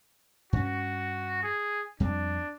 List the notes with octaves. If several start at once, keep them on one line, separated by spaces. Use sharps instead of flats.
G2 C#4 F#4
G#4
F2 G3 C4 D4